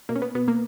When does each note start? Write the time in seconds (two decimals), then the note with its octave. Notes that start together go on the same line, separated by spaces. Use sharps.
0.09 B2 A#3
0.16 C#4
0.22 B3
0.35 B2 B3
0.48 A#3